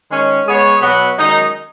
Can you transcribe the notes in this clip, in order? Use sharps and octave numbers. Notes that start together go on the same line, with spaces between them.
D#3 G#3 C#4
G#3 B3 G#4 C#5
B2 F#3 B3 F#4 B4
F#2 D#3 G#3 D#4